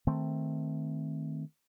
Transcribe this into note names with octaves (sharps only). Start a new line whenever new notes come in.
D#3 A3 C4